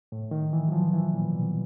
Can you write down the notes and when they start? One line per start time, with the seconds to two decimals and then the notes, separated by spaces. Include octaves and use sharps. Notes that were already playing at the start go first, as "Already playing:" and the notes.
0.12 A2
0.31 D#3
0.53 E3
0.68 F#3
0.72 F3
0.94 E3
1.13 A#2
1.33 B2